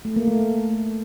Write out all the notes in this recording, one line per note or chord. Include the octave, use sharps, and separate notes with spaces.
A3
A#3
A3